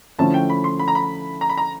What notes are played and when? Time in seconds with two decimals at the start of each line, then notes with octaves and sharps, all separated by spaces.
0.18 D3 F3 A3 C#4 E4 A5
0.34 G5
0.50 B5
0.64 C6
0.79 B5
0.88 A#5
0.95 B5
1.41 A#5
1.49 B5
1.57 A#5